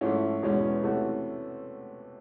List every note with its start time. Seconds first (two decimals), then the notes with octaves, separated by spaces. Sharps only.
0.01 G#2 F3 A3 C#4 E4
0.42 E2 B2 G#3 C#4 E4
0.83 C3 E3 A3 C#4 F#4